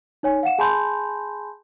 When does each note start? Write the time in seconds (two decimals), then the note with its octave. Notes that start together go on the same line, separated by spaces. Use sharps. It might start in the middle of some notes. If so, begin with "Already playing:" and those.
0.23 D#4 C#5 G#5
0.43 F5 F#5 E7
0.58 G#4 G#5 A5 B5 C6 G6